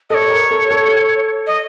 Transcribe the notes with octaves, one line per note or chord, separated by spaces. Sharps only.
A4 C#5 D#5
A#4
A4
A4
D#5